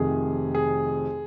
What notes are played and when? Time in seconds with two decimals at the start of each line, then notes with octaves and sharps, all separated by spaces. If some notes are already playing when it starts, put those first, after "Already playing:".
Already playing: F1 F2 C3 D#3 G#4
0.55 G#4